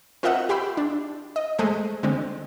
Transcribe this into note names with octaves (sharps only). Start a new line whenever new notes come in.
C4 F4 A#4 D#5 E5 F#5
G4 G5 B5 C6 E6
D4
D#5
G#3 A3 C5 D#5
D3 G#3 C4